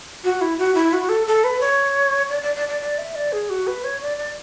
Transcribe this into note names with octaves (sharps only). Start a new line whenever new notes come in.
F#4
E4
F#4
E4
F#4
A4
A4
B4
C#5
D5
D5
D5
D5
D5
E5
D5
G#4
F#4
B4
C#5
D5
D5